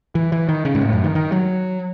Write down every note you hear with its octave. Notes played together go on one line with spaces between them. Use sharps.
E3
E3
D#3
C#3
G#2
A2
F#2
D#3
D#3
F#3